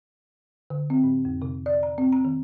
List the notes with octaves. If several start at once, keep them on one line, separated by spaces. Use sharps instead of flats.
D3
C4
A2
F2
C3
D5
A#5
C4
A#5
D#3